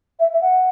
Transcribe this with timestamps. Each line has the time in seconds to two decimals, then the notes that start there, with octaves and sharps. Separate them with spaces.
0.19 E5
0.32 E5
0.41 F#5